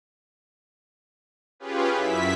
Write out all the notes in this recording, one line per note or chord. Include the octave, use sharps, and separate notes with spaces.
C#4 F4 G4 G#4 B4
F#2 E4 E5 B6